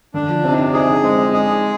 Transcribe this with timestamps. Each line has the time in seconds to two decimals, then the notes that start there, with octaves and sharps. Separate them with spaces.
0.14 D3 D4
0.29 F3
0.44 C3 C4
0.52 D#4
0.58 D4
0.73 D#4 G#4
0.89 D4
1.03 G#3 C4
1.18 D#4
1.33 D4 G#4